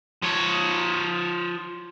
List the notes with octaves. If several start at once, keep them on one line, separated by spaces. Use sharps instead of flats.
F3 C#5